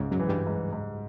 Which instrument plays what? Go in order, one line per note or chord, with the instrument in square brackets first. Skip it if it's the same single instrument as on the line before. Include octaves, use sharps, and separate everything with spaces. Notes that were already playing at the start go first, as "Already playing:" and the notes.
Already playing: [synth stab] C#2 C#3 [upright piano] G#2
[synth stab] F#2 F#3
[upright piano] E3
[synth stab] G2 G3
[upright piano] G#2
G#2